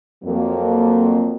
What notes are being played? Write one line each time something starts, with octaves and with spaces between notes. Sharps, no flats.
F2 F#3 A#3